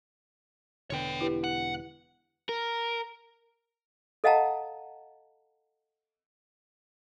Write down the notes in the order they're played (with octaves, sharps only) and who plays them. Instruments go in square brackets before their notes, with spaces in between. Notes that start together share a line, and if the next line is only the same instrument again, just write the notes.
[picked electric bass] E1 D3 B3 [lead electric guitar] C#5 G5
[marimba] E4 G4 B4
[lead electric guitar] F#5
[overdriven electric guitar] A#4
[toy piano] A4 D#5 F5 F#5 A5 A#5